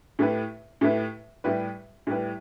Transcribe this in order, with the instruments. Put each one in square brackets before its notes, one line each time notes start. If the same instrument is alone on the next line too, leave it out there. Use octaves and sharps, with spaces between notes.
[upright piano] A2 A3 E4 G4 B4
A2 A3 E4 G4 B4
A2 G3 E4 G4 B4
A2 G3 E4 G4 B4